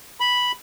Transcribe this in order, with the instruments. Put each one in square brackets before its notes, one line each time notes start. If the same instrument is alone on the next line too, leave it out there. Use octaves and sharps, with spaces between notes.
[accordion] B5